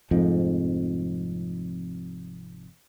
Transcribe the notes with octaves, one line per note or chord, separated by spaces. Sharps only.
F1 F2 G#2